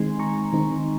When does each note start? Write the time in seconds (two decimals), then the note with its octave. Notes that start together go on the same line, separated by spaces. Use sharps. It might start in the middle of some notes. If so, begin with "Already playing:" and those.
Already playing: D#3 G#3 C4 D#4 G#5 C6
0.19 A#5 C#6
0.53 D#3 G#3 C4 D#4